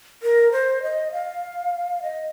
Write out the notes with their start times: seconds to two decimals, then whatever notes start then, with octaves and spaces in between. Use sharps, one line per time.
0.23 A#4
0.52 C5
0.82 D#5
1.12 F5
2.03 D#5